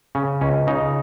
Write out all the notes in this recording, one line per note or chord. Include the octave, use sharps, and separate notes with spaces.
C#3 C#4
C#2 C#4
C#3 D#4